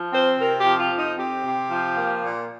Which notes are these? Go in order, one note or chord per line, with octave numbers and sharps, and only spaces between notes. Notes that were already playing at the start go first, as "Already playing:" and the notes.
Already playing: F3
C4 C5
C3 A#4
G4
F3
F4
F2
D#4
C4 G4
C3
F3
A#3
A#2